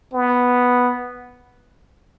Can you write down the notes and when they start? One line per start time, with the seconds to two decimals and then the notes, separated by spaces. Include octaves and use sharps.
0.13 B3